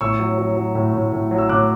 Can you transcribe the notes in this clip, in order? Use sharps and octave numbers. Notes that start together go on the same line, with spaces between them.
A2 C#6 E6
F#3
F#3
F#3
A2
A2
A2
F#3
E6
A2 D6 F#6